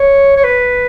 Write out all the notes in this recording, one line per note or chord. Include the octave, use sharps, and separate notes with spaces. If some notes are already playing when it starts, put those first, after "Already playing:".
Already playing: C#5
C#5
B4